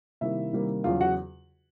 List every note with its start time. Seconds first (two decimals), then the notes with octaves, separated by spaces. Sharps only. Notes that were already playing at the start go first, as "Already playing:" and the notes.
0.21 C3 D#3 G3 A#3 E4 E5
0.53 C3 D#3 G3 A#3
0.84 E2 C#3 F#3 F4 F5
1.01 F#4 F#5